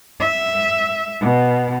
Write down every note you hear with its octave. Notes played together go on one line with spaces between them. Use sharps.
E5
B2